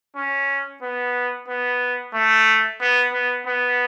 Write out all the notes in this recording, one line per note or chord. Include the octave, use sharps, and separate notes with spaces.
C#4
B3
B3
A3
B3
B3
B3